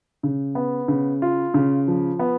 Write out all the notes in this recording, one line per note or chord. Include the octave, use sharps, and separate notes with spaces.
C#3
B3
C#3
F4
C#3
F3
B3